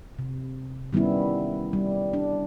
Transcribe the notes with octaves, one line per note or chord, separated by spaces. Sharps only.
C3
D#3 G3 B3 C#4 E4
G3
D4